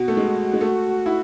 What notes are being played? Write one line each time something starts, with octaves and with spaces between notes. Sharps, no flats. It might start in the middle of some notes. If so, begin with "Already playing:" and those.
Already playing: B2 F#4
A3
G#3
G#3
A3
E4